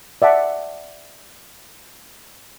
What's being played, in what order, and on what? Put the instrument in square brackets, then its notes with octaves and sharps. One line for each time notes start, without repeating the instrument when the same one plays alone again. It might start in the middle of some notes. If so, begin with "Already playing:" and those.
[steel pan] D5 E5 F#5 A5